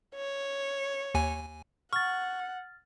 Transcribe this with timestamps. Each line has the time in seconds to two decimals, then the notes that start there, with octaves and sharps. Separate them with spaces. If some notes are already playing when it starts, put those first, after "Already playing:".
0.15 C#5
1.15 D#2 G#5
1.93 F#5 C#6 F6 A6